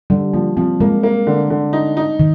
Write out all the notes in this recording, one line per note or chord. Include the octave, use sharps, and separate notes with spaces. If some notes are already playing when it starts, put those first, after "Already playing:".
D3 G3
F3 A#3
F3 C4
G#3 A#3
A#3
D3
D3
D#4
D#4
D#3